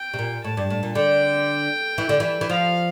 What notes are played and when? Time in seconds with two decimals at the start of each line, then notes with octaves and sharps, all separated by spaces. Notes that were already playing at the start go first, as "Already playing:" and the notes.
Already playing: G5
0.14 C3
0.19 A#2
0.44 A2 A5
0.57 G2
0.70 A2
0.83 A#2
0.95 D3 G5
1.98 E3
2.09 D3
2.20 E3
2.41 E3
2.49 F3 F5